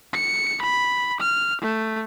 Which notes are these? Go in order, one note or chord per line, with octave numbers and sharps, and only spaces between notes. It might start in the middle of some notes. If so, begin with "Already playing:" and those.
C#7
B5
F6
A3